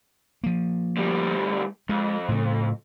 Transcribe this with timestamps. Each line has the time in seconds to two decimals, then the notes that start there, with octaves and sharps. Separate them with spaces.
0.44 F3 A#3
0.97 D2 G3
1.89 F2 G#3
2.29 A2 C#3